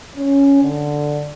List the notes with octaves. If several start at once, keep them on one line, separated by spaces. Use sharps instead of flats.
C#4
D3